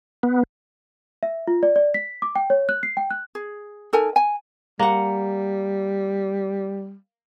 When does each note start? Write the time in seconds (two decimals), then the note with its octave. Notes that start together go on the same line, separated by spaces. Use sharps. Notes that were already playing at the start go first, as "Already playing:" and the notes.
0.23 B3
1.23 E5
1.47 F4
1.63 D5
1.76 D5
1.94 B6
2.22 D6
2.36 G5
2.50 C#5
2.69 F#6
2.83 C7
2.97 G5
3.11 F#6
3.35 G#4
3.93 D#4 A4 A#4 G#5
4.16 G#5
4.79 G3 A#3 F#5